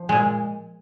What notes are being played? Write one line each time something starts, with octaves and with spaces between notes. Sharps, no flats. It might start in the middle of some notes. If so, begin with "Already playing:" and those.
Already playing: F3
A#2 G#3